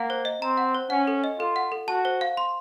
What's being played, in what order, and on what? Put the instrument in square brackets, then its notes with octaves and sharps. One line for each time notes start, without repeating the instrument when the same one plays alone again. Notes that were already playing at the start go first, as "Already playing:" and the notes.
Already playing: [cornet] A#3 [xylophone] F#5
[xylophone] C5
D#5
[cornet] C4 [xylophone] A#5
[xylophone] F#5
C5
[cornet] C#4 [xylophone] F#5
[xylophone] A4
D#5
[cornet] F4 [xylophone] A4
[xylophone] F#5
A4
[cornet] F#4 [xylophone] A5
[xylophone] C5
F5
C6